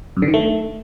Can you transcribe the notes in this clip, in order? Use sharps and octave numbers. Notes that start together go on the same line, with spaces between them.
F#2
D3
D#3
A3